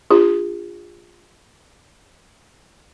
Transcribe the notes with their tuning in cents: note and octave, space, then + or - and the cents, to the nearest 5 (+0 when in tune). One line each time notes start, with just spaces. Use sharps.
D4 +0 F4 +0 G#4 -35